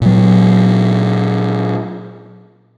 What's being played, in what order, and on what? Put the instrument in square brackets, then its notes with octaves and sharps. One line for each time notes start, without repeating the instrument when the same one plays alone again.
[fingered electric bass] A#2 F#3